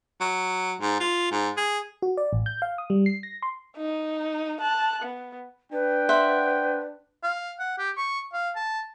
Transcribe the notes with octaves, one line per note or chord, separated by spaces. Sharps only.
F#3
G#2
F4
G#2
G#4
F#4
D5
A1
G6
F5
D#6
G3
C7
A#6
C6
D#4
A5 F#6
B3
D4 B4 G5
C5 E5 F#5
F5
F#5
G4
C#6
F5
A5